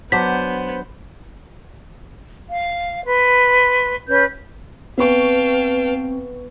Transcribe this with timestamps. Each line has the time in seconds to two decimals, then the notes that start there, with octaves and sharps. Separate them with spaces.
0.12 F#3 B3 D4 C5 B6
2.49 F5
3.06 B4 C6
4.08 C#4 B4 G6
4.98 B3 C4 B4 F5 G5 A5 C#6